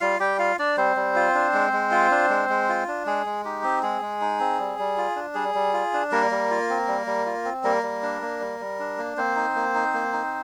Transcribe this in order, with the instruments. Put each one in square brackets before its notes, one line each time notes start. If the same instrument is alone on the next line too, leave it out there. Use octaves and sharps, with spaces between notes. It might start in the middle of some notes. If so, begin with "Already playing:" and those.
[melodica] G3 F4 F5
G3 G4 G5
F4 F5
D4 D5
G3 C4 C5
G3
F4
D4
G#3
G#3
F4
D4
G#3
G#3
F4
D4
G#3 G#4
G#3
D#4 G4
C4
G#3 G#4
G#3
D#4
C4
G3
G3
F4
D4
G3 G#4
G3
F4
D4
G3 A#3 A#4
G3
F4
C4
G3
G3
F4
C4
G3 A#3 A#4
G3
D4
A#3
G3
G3
D4
A#3
A#3 C4 C5
D#4
A#3
D#4
A#3
D#4